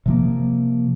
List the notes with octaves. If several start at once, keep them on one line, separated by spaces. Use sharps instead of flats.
C3 F3 A#3